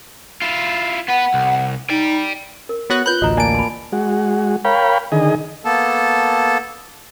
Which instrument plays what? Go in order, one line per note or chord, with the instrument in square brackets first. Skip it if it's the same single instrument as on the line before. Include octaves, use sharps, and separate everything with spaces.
[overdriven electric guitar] E4 F4
[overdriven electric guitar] B3 B4 [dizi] F#5
[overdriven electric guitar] C2
[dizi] D#4 [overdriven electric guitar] D5 G5
[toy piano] A#4
[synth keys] B3 F#4 F#6 [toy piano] C#5
[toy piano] F4 B4 B5 [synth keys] F#6 G6
[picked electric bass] A1 D2 [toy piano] F#4 A#5 [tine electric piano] D#5
[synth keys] A#3 D7 [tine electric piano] D5 G#5 A5
[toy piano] B5 C6
[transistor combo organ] G#3 F#4
A#4 C#5 F5 G5 B5
D3 D#3 G#4 D#5
[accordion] A#3 B3 A4 A5